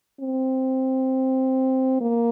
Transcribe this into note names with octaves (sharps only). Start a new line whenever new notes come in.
C4
A#3